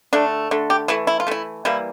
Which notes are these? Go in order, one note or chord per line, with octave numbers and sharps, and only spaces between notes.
D3 A3 D4
D3 A3
G4
E3 A3 E4
E4
F4
E3 A3 E4
E3 G3 A#3 E4